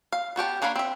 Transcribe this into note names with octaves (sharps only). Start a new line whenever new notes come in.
F5
B3 F#4 G4 A5
A#3 D4 C#5 F5 B5
C4 E5